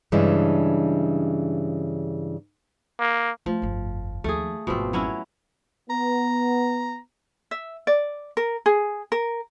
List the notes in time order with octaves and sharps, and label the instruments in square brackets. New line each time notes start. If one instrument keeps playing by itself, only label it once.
[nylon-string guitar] G2 C#3 E3 G#3 D4
[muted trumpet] A#3
[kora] F3 [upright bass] A3
[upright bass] G1 F2
[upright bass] D#2 F3 [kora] A3 G#4
[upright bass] G#1 F2 [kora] B2 F3 C4
[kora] F#3 C#4 E4
[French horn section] B3 [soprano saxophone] A#5
[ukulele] E5
D5
A#4
G#4
A#4